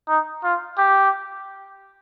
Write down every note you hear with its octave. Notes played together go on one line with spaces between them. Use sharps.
D#4
F4
G4